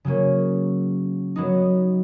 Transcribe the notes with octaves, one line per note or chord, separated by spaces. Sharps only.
C#3 F#3 A#3 C#4
F#3 B3 D#4